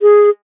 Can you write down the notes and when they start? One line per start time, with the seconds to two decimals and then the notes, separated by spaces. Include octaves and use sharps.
0.02 G#4